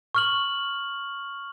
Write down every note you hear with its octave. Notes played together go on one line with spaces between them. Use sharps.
C#6 F6 F#7